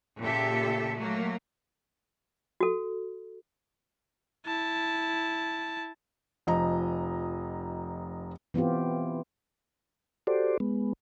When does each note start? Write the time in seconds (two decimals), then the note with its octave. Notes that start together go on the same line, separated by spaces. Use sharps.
0.20 A#2 C#3 G4 A4 E5
0.94 F#3 A3 A#3
2.60 F#4 A4
4.46 E4 A5
6.47 F1 F3 D#5 A#5
8.54 E3 B3 C4 F4 G4
10.27 F#4 G4 A4 C5 D5
10.60 G#3 B3